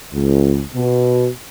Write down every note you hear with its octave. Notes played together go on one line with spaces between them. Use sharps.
C#2
B2